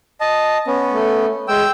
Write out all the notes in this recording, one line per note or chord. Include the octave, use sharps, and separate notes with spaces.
D#5 A5
B3 C#4
A3
G#3 G5 E6